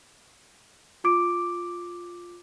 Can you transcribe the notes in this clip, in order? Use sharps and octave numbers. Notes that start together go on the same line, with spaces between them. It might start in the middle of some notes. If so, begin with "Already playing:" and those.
F4 D6 D7